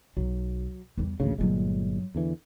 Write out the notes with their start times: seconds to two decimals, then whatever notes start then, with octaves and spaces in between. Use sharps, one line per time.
0.17 B1 F#3
0.97 E2 G3
1.20 A1 D2 A#2 C#3 A#3
1.38 G1 G2 A#2 F#3 G#3
2.15 E2 D3 E3